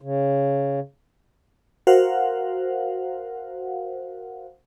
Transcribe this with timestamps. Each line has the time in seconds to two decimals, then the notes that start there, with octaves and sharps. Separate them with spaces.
0.01 C#3
1.87 F#4 A#4 C5 F5 F#5